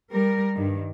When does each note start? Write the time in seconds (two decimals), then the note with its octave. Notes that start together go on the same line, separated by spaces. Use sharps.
0.13 G3 A#4
0.56 G2 D#3